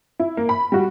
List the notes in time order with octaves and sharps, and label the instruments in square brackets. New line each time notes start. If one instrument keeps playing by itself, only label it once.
[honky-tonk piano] E4
A#3
B5
G3 F#4